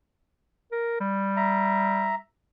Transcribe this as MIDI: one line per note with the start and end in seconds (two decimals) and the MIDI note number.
0.72 0.96 70
1.00 2.17 55
1.37 2.15 76
1.37 2.15 82